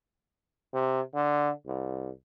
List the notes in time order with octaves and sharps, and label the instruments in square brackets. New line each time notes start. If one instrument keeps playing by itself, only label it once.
[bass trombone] C3
D3
C2